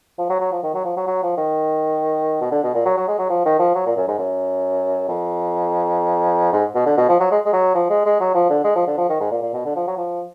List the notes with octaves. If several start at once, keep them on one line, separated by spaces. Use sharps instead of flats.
F3
F#3
F#3
F3
D#3
F#3
F3
F#3
F#3
F3
D#3
B2
D3
B2
A#2
F#3
F#3
G#3
F#3
F3
D#3
F3
F#3
A#2
F#2
G#2
F#2
F2
G#2
B2
D3
B2
F3
F#3
G#3
G#3
F#3
F3
G#3
G#3
F#3
F3
D3
G#3
F3
D3
F3
D#3
G#2
A#2
A#2
B2
D3
F3
F#3
F3